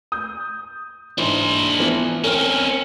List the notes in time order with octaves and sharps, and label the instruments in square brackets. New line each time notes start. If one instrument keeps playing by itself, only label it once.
[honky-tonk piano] D#6 G6
[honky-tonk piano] G#2 E3 [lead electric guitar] D4 C5
[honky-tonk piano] E3 F3 B3
[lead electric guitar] C4 C#4 [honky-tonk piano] A#4 F6